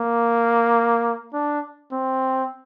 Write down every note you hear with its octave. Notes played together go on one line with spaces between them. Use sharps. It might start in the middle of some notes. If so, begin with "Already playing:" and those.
Already playing: A#3
D4
C4